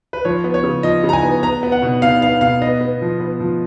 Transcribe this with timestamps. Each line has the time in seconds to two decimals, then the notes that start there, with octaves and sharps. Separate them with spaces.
0.13 B4
0.25 F3 C#5
0.44 B3
0.54 C#5
0.63 C#3
0.83 F3 D#5
1.04 C#3
1.09 A#5
1.13 G#5
1.23 B3
1.43 B3 A#5
1.63 B3
1.72 F#5
1.82 B2
2.02 B2 F5
2.21 B3 F5
2.41 B2 F5
2.61 B3 D#5
2.81 B3
3.01 F3
3.20 B3
3.40 F3